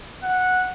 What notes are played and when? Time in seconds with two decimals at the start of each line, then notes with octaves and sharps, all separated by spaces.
0.23 F#5